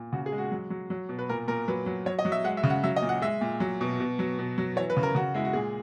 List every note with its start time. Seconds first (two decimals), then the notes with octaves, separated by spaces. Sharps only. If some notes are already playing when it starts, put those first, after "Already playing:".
Already playing: A#2
0.13 C#3 F#4
0.26 G#4
0.32 G#3
0.38 F#4
0.52 F#3
0.70 F#3
0.90 F#3
1.09 B2
1.19 B4
1.29 A#2 A#4
1.48 A#2 A#4
1.68 F#3 B4
1.86 F#3
2.06 F#3 C#5
2.19 D#5
2.25 F#3
2.32 E5
2.44 G#3 F#5
2.57 E5
2.64 C#3
2.70 F#5
2.84 F#3 E5
2.96 D#5
3.02 A#2
3.09 F#5
3.22 G#3 E5
3.41 A#2
3.60 F#3
3.81 B2
4.00 B2
4.19 F#3
4.39 B2
4.58 F#3
4.76 E3 C#5
4.90 B4
4.97 C#3
5.03 A#4
5.15 C#3 F#4
5.34 G#3 E4
5.45 F#4
5.53 A#2 G#4